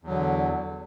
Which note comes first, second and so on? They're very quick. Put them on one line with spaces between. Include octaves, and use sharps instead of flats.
E2 F#3 D3